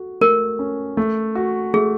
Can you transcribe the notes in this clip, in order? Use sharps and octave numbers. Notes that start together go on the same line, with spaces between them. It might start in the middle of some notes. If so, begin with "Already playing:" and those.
Already playing: F#4 A4
A3 A#4
C#4
A3
F#4
A3 G#4